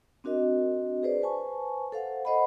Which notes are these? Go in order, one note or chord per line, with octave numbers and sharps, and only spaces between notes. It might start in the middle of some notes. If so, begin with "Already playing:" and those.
C4 D4 F#4 A#4 D#5
G#4 B4 C5 D5
B4 C5 G#5 A5 C#6
A4 C5 F5 F#5
A4 C5 D#5 F#5 B5